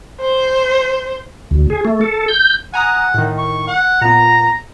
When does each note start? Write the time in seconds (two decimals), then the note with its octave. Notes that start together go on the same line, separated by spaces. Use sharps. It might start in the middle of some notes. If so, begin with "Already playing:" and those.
0.21 C5
1.51 D2
1.70 G#4
1.85 A3
2.01 A4
2.28 G6
2.74 F#5 G#5 A#5 D#6
3.14 A2 D#3
3.38 C#6
3.67 F#5
4.01 A#2 B3 A#5